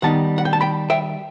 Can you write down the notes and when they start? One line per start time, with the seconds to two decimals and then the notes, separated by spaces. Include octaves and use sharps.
0.02 D#3 G3 B3 D#4 F#5 A5
0.38 F#5
0.45 G5
0.53 A5
0.61 G5 B5
0.90 E5 G5